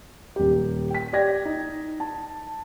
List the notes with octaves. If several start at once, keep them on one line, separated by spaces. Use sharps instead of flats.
D#1 G4
G5 B6
G4 D5 G5 G#6 A#6
D#4
A5